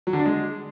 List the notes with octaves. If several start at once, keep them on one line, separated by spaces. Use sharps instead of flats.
F#3
D3
D4
G#3